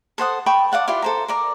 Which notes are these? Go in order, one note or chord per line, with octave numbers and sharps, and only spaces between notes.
A4 C5 F#5 D#6
G5 A5 B5 C#6
D5 F5 F#5 A5
E4 F4 G4 D5
A4 C5 A#5
A#4 D5 A#5